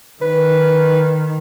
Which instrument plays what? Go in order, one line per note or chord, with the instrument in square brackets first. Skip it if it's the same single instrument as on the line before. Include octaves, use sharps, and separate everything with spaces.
[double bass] D#3 [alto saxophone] B4